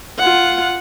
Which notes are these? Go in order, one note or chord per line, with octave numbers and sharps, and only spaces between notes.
F4 F#5